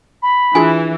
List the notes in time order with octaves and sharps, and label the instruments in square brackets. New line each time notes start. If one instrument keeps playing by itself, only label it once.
[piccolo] B5
[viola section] E3 [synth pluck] D4 F4 G#4 [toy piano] G#5